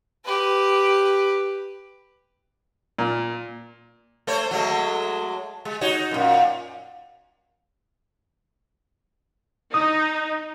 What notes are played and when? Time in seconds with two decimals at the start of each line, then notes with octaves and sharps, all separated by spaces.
0.25 G4 B4
2.99 A#2
4.27 A3 C5 C#5
4.51 F#3 G#3 A3
5.65 G#3
5.81 D#4 F#4 C#5
6.11 F#2 A#2
9.74 D#4 D#6